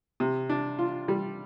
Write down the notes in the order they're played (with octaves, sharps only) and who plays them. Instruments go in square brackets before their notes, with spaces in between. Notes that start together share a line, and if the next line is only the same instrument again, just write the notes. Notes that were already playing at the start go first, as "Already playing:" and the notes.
[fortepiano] C3
D4
F4
G3